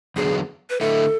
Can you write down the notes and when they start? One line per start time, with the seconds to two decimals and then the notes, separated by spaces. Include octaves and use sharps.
0.16 E2 D3 F#3 B3 G#4
0.70 B4
0.80 D3 A3 E4 A4